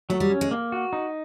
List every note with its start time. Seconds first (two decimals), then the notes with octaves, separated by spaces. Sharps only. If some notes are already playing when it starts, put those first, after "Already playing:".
0.10 F#3 A3
0.20 G3
0.30 C#4
0.41 G#3
0.51 A#3
0.72 F#4
0.93 D#4